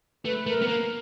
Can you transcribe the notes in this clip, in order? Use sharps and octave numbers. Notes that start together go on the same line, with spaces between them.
A3 B4
A3 A#4
B3
A#3 A#4